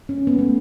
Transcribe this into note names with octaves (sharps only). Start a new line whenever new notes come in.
C#4
B3
A3